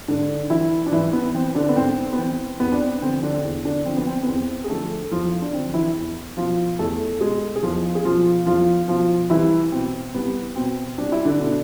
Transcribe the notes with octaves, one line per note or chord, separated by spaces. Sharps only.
G#2 D3 D4
E3 E4
D4
G#2 E3 E4
B3
E3 C4
D3 D4
B3
G#2 C4
B3
E3 C4
E2 B3
D4
C4
D3 F3 C4
D3 D4
E2
D3 D4
D3 F3 C4
B3
C4
B3
E2 C4
G#4
D3 F3 A3 A4
E2 F3 F4
D4
D3 F3 C4
E3 E4
E2
B2 F3 F4
E2 A3 A4
B2 G#3 G#4
G#4
E2 F3 F4
G#4
B2 F3 F4
E2 F3 F4
B2 F3 F4
C2 E3 E4
B2 C4
C2 B3
B2 C4
C2 D4
E4
D3 D4
B2 D3 D4